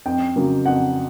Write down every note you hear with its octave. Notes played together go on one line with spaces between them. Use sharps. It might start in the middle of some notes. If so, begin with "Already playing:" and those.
F2 G5
C#3 F#3 A#3
F2 F#5